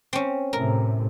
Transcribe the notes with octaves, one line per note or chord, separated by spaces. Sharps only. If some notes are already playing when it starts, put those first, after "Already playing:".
C4 C#4
A2 C3 A#4